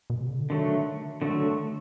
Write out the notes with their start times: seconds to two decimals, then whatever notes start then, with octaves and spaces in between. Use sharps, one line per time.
0.10 B2
0.21 C3
0.31 C#3
0.39 D3
0.50 D3 D#3 F#3 A3
1.22 D3 F#3 A3